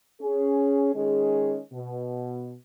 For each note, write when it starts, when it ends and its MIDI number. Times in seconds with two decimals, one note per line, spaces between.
0.22 0.94 61
0.22 0.94 68
0.95 1.59 51
0.95 1.59 56
0.95 1.59 61
0.95 1.59 68
1.74 2.56 47